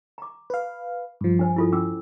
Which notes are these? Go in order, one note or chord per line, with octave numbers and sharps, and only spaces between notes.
A#5 D6
B4 F5
G2 F3
D4 C5 G#5
E4 F4 A4
C#4 D6 E6